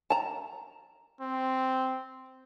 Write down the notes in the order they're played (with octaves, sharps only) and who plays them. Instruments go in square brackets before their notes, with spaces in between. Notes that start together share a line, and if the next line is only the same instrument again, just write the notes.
[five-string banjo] A5 A#5
[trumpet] C4